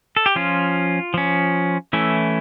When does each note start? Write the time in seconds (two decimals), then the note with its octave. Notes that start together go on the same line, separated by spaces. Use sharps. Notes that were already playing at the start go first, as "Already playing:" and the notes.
0.17 A4
0.26 G4
0.36 F3 C#4 F4
1.14 F3 C#4
1.93 E3 A3 C#4 E4